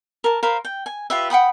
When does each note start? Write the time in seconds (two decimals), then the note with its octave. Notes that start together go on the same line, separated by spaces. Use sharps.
0.24 A#4 A5
0.43 A#4 C5 F5 B5
0.65 G5
0.86 G#5
1.10 F4 G4 B4 E5
1.30 F#5 G5 B5 D#6